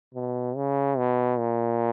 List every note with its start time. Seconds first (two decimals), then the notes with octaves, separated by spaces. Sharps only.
0.14 B2
0.56 C#3
0.98 B2
1.39 A#2